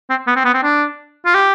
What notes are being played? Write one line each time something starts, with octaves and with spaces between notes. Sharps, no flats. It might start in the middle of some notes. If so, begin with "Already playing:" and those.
C4
B3
C4
B3
C4
D4
F4
G4